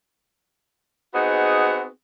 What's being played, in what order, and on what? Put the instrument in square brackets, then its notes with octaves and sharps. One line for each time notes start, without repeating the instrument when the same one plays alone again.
[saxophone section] B3 C4 D#4 F#4 G#4